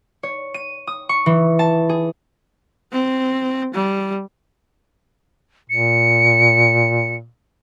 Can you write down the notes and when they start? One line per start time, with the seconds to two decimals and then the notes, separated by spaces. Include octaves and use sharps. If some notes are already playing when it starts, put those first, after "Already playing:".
0.23 C#5
0.54 D#7
0.87 D#6
1.09 C#6
1.26 E3
1.59 A5
1.89 G#4
2.92 C4
3.74 G3
5.70 A#2 C#7